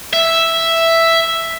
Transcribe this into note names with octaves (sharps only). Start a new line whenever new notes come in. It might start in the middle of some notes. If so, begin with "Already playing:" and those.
E5